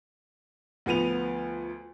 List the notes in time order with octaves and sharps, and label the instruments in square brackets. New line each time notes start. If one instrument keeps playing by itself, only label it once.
[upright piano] D2 F3 B3 D#7 F7